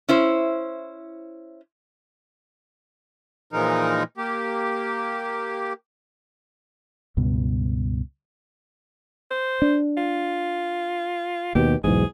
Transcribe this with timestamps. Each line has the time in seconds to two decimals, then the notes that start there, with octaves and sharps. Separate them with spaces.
0.09 C#4 E4 C5
3.53 A#2 E3 F3 G#3 D#4 A#4
4.17 A#3 G4
7.17 C#2 G2 B2
9.31 C5
9.62 D4
9.97 F4
11.55 D#2 B2 G4
11.84 B1 E2 G#2 G#4